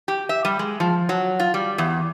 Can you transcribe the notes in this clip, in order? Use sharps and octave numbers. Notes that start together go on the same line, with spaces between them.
G4
E5
G3
G#3
F3
F#3
F4
G3
E2